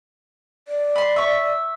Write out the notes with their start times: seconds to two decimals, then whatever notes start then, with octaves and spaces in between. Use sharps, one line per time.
0.68 D5
0.96 B5 C6
1.16 E5 C#6